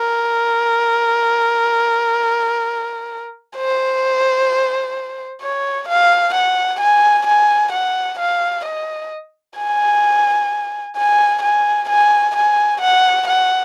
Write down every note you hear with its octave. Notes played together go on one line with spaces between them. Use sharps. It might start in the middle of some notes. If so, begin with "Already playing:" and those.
Already playing: A#4
C5
C#5
F5
F#5
G#5
G#5
F#5
F5
D#5
G#5
G#5
G#5
G#5
G#5
F#5
F#5